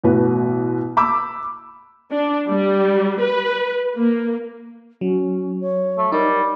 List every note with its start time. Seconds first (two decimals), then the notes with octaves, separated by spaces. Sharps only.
0.04 A1 B2 B4
0.97 B5 D6 E6
2.10 D4
2.48 G3
3.19 B4
3.96 A#3
5.01 F#3 C#4
5.61 C#5
5.98 A3
6.12 G3 D#4 A#4